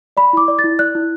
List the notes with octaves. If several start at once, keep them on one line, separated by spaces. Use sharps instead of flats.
D5 B5
E4 D6
D5
A6
E4
D5 F#6
E4